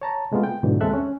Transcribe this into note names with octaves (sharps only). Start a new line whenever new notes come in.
C#5 A5 A#5
C3 G#3 A3 B3 F4
G5
G#2 B2 D3 E3 F#3
D#2 G#3 C4 A4 E5 F#6
C#4